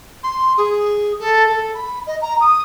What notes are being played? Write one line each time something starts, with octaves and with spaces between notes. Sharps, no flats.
C6
G#4
A4
A4
B5
D#5
A#5
D#6